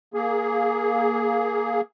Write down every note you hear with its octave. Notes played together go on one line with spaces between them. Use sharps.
A#3 G#4